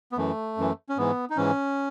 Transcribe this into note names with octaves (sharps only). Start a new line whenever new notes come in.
B3
F#2 E3 A3
F#2 E3
C#4
G#2 E3 B3
D#4
G#2 E3 C#4